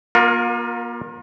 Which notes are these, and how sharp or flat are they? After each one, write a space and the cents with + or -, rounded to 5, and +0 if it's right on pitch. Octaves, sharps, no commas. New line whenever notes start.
A#3 +40 F4 +35 A#4 +0